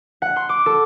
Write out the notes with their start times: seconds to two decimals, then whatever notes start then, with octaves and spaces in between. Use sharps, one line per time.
0.22 F#5
0.36 C6
0.49 D6
0.66 A4